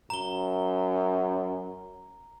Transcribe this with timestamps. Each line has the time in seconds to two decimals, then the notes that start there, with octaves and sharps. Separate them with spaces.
0.10 F#2 A#5 G7